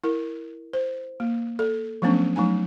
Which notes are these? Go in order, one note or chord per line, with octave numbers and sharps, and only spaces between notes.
E4 A#4
C5
A#3
A4
F3 F#3 A3 B3 C#4 D4
F#3 A3 D#4 G#5